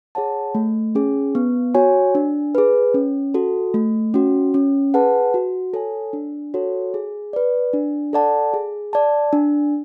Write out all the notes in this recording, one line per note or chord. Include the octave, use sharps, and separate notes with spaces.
G#4 C#5 F#5 A5
A3
C#4 G#4
B3
F#4 C#5 G#5
D4
G#4 B4
C#4
F#4 A4
A3
C#4 F#4
C#4
G#4 B4 F#5 A5
F#4
A4 C#5 G#5
D4
F#4 A4 C#5
G#4
B4 D5
D4
A4 D5 F#5 A5
G#4
D5 A5
D4